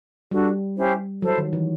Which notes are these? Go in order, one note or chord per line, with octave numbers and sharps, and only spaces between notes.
G3 D4 F#4 A4
C#4 E4 G4 C5
F#3 E4 A4 C5
D#3
E3